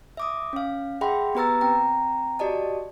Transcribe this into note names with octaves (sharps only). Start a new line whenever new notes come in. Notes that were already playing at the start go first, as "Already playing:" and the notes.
E5 D6 D#6
C#4 F5
G#4 E5 F#5 G5 B5 C6
B3 G4 B4 A#5 E6 A6
C4 G5 A#5
F#4 G4 D5 D#5 A5